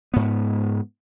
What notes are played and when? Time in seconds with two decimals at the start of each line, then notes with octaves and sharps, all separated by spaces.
0.14 G#2 B3